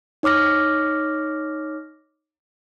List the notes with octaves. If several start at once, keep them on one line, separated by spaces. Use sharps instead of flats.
D#4 C#5 D6 F6 A#6